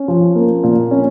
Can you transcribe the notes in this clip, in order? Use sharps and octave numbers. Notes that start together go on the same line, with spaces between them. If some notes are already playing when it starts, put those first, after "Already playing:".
Already playing: C#4
F3
A#3
A#2
C#4